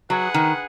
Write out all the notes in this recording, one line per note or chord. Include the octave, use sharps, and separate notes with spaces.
F#3 D#4 G#4 B4 F#5
D#3